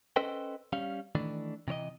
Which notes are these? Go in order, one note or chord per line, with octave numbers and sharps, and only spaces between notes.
C#4 A4 B4 C5 D#5 G5
G3 C#4 F5
D#3 E3 A3 D4
C3 E3 C#5 D#5